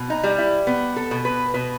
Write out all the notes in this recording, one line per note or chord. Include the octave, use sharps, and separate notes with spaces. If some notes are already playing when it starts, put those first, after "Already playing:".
Already playing: B2
D#4
G3
E4
B3
A4
B2
B4
B2 B4